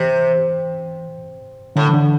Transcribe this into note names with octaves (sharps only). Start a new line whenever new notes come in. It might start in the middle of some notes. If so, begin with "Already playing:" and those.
Already playing: C3 E3
A2 D3
E3
D3